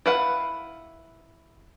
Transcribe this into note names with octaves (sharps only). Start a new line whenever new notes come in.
E4 B4 F5 F#5